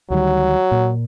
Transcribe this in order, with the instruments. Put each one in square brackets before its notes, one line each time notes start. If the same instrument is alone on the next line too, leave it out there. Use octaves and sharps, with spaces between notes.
[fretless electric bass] D2 D#3 G3 [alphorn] F#3
[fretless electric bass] A#2